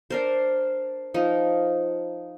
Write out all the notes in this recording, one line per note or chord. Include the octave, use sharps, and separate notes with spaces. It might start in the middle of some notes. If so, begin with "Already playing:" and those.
D4 A#4 C5
F3 D#4